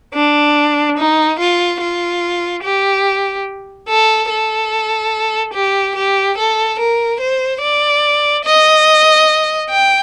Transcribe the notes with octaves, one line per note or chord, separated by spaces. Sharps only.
D4
D#4
F4
F4
G4
A4
A4
G4
G4
A4
A#4
C5
D5
D#5
G5